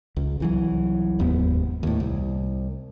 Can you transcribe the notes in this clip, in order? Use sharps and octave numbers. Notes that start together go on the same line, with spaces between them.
C#2
C2 E3 F#3
F1 D#2 G#2 B3
D#2 A2
C2